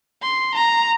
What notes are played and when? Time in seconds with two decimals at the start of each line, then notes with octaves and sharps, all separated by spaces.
0.22 C6
0.54 A#5